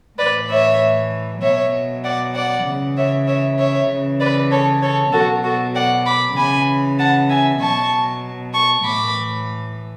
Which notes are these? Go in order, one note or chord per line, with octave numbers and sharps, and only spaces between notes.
A2 E3 B4 D5
C#5 E5
B2 F#3 C#5 E5
D5 F#5
D5 F#5
C#3 E3
C#5 E5
C#5 E5
C#5 E5
C#3 E3
B4 D5
A4 C#5
A4 C#5
B2 F#3 F#4 A4
F#4 A4
D5 F#5
B5 D6
C#3 E3 G#5 B5
F#5 A5
E5 G#5
B2 F#3 A5 C#6
A5 C#6
A2 E3 B5 D6